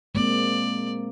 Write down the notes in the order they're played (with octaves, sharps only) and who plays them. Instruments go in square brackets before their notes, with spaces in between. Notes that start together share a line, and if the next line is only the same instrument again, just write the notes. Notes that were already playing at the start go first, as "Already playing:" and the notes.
[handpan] G#3 A#3 C4 [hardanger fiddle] D5